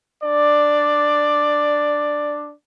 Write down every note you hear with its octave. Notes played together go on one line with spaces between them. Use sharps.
D4 D5